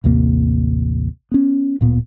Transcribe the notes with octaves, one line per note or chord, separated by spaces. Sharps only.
A1 D#2 C3 A#3
B3 C#4
D1 A#2 B3